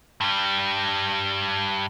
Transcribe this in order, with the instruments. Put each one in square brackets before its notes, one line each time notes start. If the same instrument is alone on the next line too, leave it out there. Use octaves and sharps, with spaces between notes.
[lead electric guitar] G2 G3